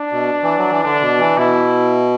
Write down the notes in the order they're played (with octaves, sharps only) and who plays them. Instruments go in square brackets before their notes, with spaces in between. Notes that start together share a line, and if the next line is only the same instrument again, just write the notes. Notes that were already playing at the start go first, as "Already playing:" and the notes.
Already playing: [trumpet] D4
[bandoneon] B2
E3
F#3
E3
[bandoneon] D3 [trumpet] D4
[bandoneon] B2
E3
[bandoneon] B2 [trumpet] E4